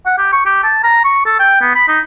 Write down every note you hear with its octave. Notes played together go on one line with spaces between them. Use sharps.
F#5
G4
C#6
G4
A5
A#5
C#6
A4
G5
B3
B5
D#4